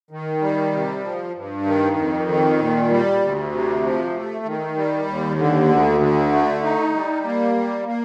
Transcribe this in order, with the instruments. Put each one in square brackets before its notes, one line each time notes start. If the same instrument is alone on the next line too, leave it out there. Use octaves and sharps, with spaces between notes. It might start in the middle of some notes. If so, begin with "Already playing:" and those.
[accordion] D#3
G3
C3
F3
G2
D#3
F2
D#3
A#2
G3
D2
C3
F3
A3
D#3
G3
D#2
D3
D2
D3
A3
D#4
G3
A#3
G3
A#3